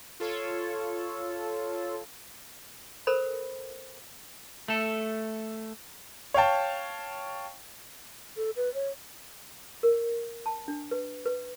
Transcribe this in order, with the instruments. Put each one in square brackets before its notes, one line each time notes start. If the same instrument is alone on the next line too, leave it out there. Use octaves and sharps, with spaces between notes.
[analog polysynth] F4 A4 C#5
[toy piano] A4 A#4 C5 B5
[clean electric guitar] A3 A4
[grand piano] C#5 F5 G5 A5
[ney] A4
B4
C#5
[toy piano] A#4
A5
D4
B4
B4